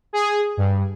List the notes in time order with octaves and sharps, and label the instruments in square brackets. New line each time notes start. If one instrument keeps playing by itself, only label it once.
[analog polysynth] G#4
G2